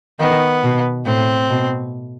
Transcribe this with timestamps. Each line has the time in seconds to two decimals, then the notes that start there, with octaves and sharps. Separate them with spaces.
0.20 D#3 B3
0.63 B2
1.06 A2 C4
1.49 B2